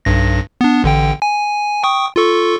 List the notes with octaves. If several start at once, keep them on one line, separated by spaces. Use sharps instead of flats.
B1 G2 A#6
B3 D4
A1 D3 G5
G#5
G5 C#6 D#6
F4 A4 C#6